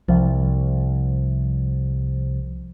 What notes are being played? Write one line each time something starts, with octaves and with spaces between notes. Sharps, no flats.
C2 F3